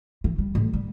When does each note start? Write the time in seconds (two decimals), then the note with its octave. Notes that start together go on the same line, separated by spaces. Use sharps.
0.24 E3
0.38 G3
0.55 A1
0.73 G3